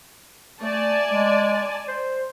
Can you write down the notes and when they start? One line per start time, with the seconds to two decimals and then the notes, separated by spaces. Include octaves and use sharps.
0.62 A3 D5 G#5 A5
1.07 G#3
1.88 C5